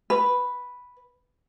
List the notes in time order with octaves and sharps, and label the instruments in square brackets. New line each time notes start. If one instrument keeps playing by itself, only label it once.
[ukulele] B4